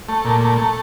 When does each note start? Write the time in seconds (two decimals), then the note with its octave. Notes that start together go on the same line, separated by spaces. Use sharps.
0.09 A3
0.24 A#2
0.41 A3
0.58 A3